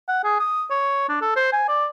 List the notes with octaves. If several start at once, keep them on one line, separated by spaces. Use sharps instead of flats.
F#5
G#4
D#6
C#5
D4
A4
C5
G#5
D5